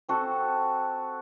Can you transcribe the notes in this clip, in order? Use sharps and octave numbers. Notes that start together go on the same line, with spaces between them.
C4 F#4 A4